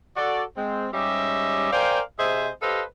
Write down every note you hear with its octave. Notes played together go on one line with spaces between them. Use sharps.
F#4 A4 D5
G#3 C4
G#2 G3 C#4 G4 D#5 E5
A#4 C5 D5 F5 G5 G#5
C3 G#4 C5 D#5 E5
G4 A4 B4 C5 D#5 F5